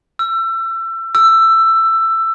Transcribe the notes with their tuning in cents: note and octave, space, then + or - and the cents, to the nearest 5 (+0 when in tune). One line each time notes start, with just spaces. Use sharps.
E6 +30
E6 +15